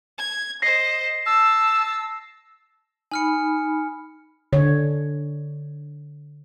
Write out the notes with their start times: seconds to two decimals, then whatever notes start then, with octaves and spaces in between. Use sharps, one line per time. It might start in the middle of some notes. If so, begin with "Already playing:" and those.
0.19 G#6
0.62 C5 D#5 A#6 C7
1.26 A5 E6
3.11 D#4 G#5 B5 F6 C#7
4.53 D3 C#5